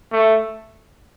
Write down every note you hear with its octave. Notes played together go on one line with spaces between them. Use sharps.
A3